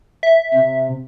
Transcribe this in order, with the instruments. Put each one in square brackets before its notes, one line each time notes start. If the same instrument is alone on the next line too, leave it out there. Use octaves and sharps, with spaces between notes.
[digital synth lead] E5
[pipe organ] C3